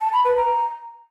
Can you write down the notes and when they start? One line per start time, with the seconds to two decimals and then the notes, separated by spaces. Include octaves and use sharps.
0.01 A5
0.13 B5
0.25 B4
0.37 A#5